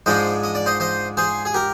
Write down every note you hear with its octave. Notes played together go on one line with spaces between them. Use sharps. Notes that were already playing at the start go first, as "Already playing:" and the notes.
G#2 F3 G#3 D4 C5 D#5
D#5
D5
C5 D#5
C5 D#5
G#4 C5
G#4
G4 A#4